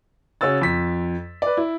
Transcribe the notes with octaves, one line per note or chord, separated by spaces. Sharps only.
C#3 C#4 F#4 E6 A6
F2 B6
B4 D5
E4